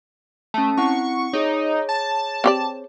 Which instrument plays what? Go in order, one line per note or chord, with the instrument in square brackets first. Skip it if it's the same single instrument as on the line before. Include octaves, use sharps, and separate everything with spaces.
[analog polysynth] A3 [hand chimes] C#4 A5
[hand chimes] C4 E4 F#5 [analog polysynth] C#6
[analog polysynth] D#4 [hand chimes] G#4 C#5
[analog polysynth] A5
[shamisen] C4 G4 D5